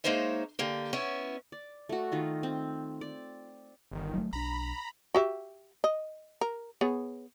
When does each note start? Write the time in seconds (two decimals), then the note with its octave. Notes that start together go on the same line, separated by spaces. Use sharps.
0.04 G#3 A#3 D#4 C5 C#5 E5
0.59 D3 A#3 G4
0.93 B3 C#4 E4 C#5
1.52 D5
1.89 A3 F#4
2.12 D#3 F4 D#5
2.43 C4
3.01 D5
3.92 G1 D#3
4.14 F#3 G#3 A3
4.33 B1 D4 A#5 B5
5.14 F#4 G4 E5
5.84 D#5
6.41 A#4
6.81 B3 G#4 C#5